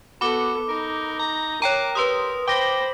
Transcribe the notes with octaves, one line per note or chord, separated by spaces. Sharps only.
B3 F#4 A4 B5 D6
D#4 A#4
A#5
A#4 C#5 G5 A#5 D6
G4 B4 C6 D#6
C5 G5 B5 D6 A#6